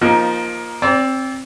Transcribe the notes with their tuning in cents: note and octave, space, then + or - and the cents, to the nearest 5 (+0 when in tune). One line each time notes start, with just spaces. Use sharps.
F3 +0 A#3 +15 D#4 +0
C4 +15 D5 -30